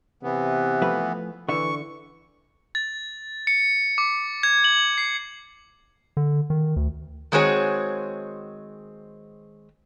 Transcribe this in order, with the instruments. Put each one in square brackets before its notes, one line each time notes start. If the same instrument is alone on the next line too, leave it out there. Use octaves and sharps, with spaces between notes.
[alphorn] C3 [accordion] E3 B3
[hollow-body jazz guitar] F3 A3 B4
[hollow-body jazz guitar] D3 E5 [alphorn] E3 [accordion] C#6
[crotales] A6
C#7
D6
G#6
F#7
C7
[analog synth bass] D3
D#3
D2
[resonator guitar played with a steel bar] D#3 G#3 C4 F#4 G#4 C#5